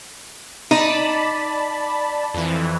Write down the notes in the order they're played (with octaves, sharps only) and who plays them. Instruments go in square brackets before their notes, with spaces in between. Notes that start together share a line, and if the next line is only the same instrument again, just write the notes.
[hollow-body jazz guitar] D#4 [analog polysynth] D5 A5 B5
[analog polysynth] F2 E3